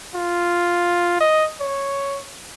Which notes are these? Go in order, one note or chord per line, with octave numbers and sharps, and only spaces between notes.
F4
D#5
C#5